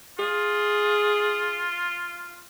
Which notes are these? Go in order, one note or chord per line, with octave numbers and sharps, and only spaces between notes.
F4 G#4